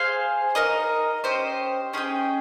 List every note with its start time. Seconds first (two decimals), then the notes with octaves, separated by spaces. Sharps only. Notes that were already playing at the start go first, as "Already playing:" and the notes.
Already playing: G#4 C5 F5 G#5
0.55 D#4 A#4 D#5
1.24 C#4 G4 C5 D#5
1.94 C#4 G#4 D#5 G5